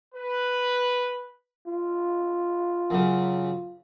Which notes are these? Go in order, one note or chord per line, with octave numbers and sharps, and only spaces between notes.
B4
F4
F#2 C#3